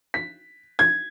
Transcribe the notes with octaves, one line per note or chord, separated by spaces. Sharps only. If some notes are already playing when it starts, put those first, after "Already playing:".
B6
G#6